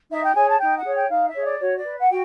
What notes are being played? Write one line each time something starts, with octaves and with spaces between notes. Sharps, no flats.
D#4 E5
G5
G#4 C#5 G#5
A5
D#4 G5
F#5
G#4 C#5
G5
D#4 F5
E5
G#4 C#5
D5
F#4 C#5
D5
B4
F#5
F#4 G5